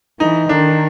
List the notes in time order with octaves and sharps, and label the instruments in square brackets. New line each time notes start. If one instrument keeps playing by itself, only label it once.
[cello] E3 [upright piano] D#4
[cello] D#3 [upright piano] D4